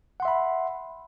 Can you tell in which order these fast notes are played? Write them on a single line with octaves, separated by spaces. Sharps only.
F#5 C6 E5 B5